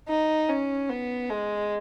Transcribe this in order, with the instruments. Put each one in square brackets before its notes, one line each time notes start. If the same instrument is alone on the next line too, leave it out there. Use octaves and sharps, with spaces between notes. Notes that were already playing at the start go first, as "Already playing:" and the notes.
[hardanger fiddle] D#4
C#4
B3
G#3